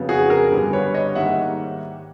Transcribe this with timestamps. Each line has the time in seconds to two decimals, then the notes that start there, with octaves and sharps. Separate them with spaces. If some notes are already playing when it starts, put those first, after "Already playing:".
Already playing: F2 C#3 F#3 B3
0.09 F#4 G#4
0.30 G#4 A#4
0.52 G2 D3 G3 B3
0.73 B4 C#5
0.94 C#5 D#5
1.15 G#2 D#3 G3 A#3 E5 F#5